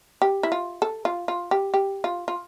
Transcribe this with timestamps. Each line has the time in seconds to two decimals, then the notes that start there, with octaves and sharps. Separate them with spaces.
0.22 G4
0.43 E4
0.52 F4
0.82 A4
1.05 F4
1.28 F4
1.51 G4
1.74 G4
2.04 F4
2.28 F4